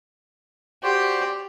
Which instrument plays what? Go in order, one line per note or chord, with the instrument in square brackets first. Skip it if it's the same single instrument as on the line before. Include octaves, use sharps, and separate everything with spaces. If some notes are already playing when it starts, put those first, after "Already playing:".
[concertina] F#4 C5 D5 [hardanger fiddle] G4